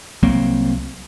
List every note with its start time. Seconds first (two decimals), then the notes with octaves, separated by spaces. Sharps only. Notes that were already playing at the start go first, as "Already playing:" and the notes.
0.23 C2 F#3 A#3 C4